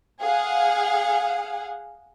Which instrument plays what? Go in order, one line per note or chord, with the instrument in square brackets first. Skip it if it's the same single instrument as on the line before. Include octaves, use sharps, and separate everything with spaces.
[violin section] G#4 F5 F#5